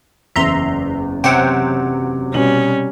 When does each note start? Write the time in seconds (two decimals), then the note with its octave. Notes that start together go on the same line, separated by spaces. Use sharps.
0.36 F#1 E2 E5 A#5 C6
1.24 C3 F#3 C5 F#5 G5
2.34 B2 G3 C#4 F#7